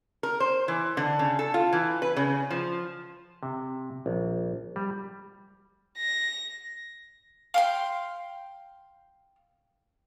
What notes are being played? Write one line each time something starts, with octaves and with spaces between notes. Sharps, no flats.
A#4
C5
E3
D3
C#3
A4
F4
E3
B4
C#3
F3
C3
A#1
G3
A#6
F5 G5 C6